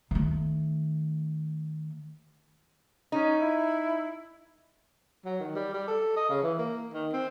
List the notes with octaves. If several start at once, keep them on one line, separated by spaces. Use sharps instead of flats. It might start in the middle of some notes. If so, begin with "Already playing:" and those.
D#3 A3
C#4 D#4
E4
F#3
D#3
G3
G3
A4
D#5
C#3
E3
A#3
D#3
C4